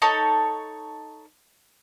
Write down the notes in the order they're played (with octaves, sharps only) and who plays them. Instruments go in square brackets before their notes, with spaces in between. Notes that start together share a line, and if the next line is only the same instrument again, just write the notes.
[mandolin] D#4 A4 C#5